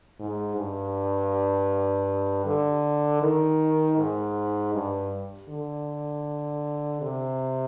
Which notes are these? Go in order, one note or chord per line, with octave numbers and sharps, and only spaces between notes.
G#2
G2
D3
D#3
G#2
G2
D3
C3